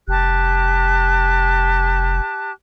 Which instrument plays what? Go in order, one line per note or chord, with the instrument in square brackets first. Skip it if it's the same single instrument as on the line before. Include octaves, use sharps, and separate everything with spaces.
[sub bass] F1 [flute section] G4 A5 F#6